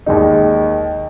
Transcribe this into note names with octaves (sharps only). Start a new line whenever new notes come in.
D#2 D#3 G#3 D#4